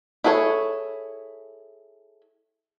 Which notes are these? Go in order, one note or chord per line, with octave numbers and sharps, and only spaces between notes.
E4 G#4 A4 B4 C#5